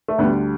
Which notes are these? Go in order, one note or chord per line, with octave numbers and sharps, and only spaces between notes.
A3
D2 D3 G3 B3